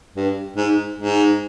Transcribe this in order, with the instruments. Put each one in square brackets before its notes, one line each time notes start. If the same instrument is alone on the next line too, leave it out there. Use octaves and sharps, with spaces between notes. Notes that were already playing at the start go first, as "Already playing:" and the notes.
[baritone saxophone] G2
G#2
G#2